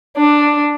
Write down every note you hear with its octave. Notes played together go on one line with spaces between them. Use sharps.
D4